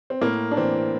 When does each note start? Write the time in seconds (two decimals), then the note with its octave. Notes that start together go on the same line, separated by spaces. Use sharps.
0.10 C4
0.22 A2 A#3
0.51 D4
0.57 E3 C4